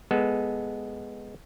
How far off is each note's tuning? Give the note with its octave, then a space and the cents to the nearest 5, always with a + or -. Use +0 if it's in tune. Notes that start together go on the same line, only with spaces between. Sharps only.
G#3 +0 B3 +0 A4 -20